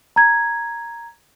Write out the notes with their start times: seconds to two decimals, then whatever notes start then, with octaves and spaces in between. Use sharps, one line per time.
0.16 A#5 G#6